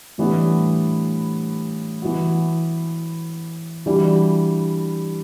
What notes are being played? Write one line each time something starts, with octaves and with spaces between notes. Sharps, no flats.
A2 E3 G3 B3 D4
E3 B3 F#4
E3 G3 D4 F#4